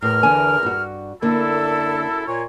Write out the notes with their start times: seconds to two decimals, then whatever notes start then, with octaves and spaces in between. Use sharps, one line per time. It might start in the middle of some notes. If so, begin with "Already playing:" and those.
0.02 E2 A2 A#4 F6
0.23 D3 E3 G#5
0.63 G2 F#4
1.22 F#2 D3 A#3 E4 A4
2.27 A#2 C#5